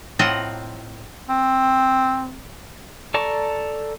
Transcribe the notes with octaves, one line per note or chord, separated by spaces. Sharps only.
A2 C4 F4 D#5 F#5 A#5
C4
A4 D5 A5 A#5 C#6